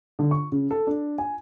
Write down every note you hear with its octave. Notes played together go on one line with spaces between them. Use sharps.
D3
C#6
C#3
A4
D4
G#5